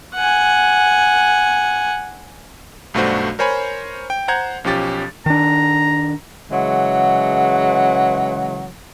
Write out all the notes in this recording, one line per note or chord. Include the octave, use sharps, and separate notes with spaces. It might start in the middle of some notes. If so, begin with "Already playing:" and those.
F#5 G#5
B1 G2 A3 D4 F#4 C5
A#4 C5 C#5 G#5 B5
G5
C5 F#5 A#5 G6 G#6
B1 F3 C#4 G4 A6
D#3 D4 A#5
C#3 E3 F#3 G#3 F#5